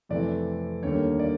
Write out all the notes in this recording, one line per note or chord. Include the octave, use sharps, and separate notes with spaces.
F2 C3 E3 A3 D5
D#2 D3 G3 A#3 C#5
D5